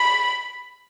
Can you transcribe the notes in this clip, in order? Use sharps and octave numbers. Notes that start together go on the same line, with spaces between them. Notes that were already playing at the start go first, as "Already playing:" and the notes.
Already playing: B5